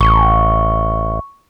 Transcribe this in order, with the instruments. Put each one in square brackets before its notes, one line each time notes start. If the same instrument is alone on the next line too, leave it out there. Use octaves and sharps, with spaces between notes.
[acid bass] A1 [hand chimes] C#6